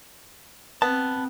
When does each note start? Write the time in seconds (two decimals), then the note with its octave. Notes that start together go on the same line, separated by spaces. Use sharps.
0.82 B3 C4 A5